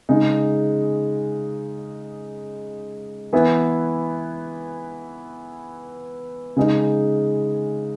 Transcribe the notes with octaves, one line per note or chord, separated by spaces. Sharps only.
C#3 G#3 D#4
E3 B3 E4
C#3 G#3 D#4